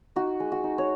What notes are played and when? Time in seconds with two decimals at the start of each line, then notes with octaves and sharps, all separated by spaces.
0.16 D#4 F#4
0.40 G#3
0.52 F#4
0.64 D#4
0.78 C#5